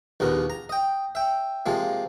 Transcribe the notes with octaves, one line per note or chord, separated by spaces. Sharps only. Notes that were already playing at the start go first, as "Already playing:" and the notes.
A#1 D#2 B3 A#4
A#5
D#5 G5
E5 G5
C3 F3 G#3 A#3